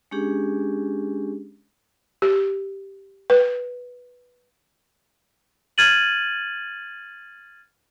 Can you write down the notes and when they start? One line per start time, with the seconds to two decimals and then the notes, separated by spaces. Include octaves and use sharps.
0.11 G#3 C#4 D4 G4 G#4
2.22 G4
3.30 B4
5.78 F6 G#6 A6 D#7 F#7